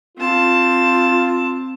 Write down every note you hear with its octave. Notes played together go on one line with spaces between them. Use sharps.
C4 F4 A5